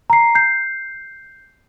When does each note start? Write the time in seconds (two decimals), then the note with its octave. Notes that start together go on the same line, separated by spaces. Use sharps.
0.10 A#5 C7
0.35 G6 C7